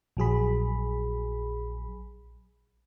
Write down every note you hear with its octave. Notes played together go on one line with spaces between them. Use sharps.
A#1 F#3 G#4 B5